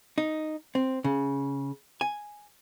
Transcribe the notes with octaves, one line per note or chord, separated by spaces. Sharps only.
D#4
C4
C#3
G#5